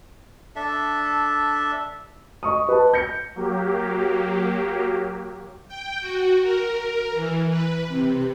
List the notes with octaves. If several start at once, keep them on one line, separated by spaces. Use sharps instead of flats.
D4 A4 E5
D#5 C#6 D#6
B4 A5
G6 A#6 C#7
F#3 A#3 G4
G5
F#4
A#4
E3
B4
C3